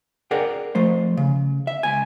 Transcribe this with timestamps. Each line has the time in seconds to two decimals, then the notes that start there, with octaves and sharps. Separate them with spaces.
0.31 G#4 A#4 D5 F#5 G5
0.75 F3 A3 C5
1.17 C#3
1.67 E5
1.83 C#2 G#5